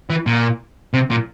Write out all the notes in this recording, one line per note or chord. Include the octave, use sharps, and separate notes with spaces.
E3
A#2
C3
A#2